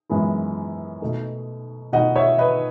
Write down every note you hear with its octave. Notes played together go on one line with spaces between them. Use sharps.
F#2 E3 G#3 B3 E4
B2 A3 D#4
B2 A3 D#4 D#5 F#5
C#5 E5
B4 D#5